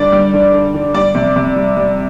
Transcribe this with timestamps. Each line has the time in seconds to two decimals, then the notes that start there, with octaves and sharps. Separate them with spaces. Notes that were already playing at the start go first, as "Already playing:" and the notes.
Already playing: D3 G3 D5
0.12 G3
0.33 D3
0.53 D3
0.74 D3
0.94 G3 D5
1.15 C3
1.36 C3
1.56 G3
1.77 G3